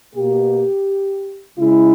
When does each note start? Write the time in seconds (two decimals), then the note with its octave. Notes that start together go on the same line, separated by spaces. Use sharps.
0.15 B2 A#3 G4
1.59 C#3 G#3 E4